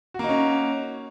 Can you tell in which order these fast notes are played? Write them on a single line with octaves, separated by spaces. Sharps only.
F#4 A#3 D#4 C#4